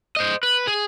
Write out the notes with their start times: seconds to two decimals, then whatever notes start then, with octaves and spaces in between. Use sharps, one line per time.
0.16 C5 D#5
0.43 B4
0.67 G#4